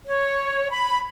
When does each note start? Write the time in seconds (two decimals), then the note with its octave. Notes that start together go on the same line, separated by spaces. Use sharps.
0.07 C#5
0.70 B5